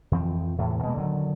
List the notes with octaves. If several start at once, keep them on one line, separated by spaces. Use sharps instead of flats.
F2 E3 F3 C4
E2 A2 C3
B2 G#3 A#3
D3 D#3 F#3